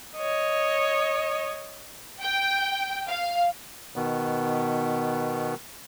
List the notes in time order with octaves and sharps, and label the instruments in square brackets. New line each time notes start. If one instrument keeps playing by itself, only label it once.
[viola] C#5 D#5
[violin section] G5
F5
[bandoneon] B2 D#3 B3